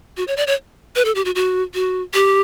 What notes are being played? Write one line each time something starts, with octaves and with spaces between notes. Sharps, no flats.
F#4
C#5
D5
C#5
B4
A4
G4
F#4
F#4
F#4
G4